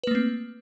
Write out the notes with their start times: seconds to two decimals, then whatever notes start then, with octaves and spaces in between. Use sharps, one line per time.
0.04 B4
0.07 A#3
0.11 A3
0.15 C4